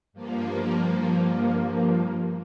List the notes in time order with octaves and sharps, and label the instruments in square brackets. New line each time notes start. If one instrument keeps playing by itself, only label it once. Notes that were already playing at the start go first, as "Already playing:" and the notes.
[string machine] G2 F3 A#3